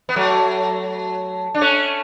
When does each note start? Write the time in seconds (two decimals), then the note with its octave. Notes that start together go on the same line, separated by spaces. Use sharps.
0.09 B3
0.16 F#3 A3
1.54 D4
1.61 A3 C#4